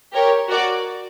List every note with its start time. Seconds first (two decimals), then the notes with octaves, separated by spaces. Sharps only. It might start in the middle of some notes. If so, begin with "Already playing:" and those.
0.13 G4 A#4 C#5
0.48 F#4 A#4 D5